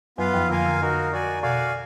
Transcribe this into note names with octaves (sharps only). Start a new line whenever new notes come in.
F#2 F#3 B3 F4 B4 F5
F2 F3
D3 A#3 F4 A#4 F5 G#5
D3
D#4 F#4 A#4
F#4 D5 G#5
B2 F#4 D5 F5 G#5